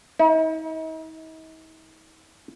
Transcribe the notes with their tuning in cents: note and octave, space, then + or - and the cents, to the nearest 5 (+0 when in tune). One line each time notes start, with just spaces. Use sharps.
D#4 +45